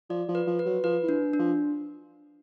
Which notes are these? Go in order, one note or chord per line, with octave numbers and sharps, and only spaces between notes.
F3 D5
F3
B4
F3
B4
F#3
F3 B4
E3
D4
D4
F3